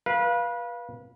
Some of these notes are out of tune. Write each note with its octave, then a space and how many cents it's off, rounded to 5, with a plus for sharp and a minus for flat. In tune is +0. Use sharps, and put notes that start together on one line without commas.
B4 -30 F5 +0